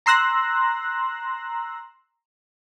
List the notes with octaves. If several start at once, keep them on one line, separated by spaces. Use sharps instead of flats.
A#5 C6 E6 F#6 A#6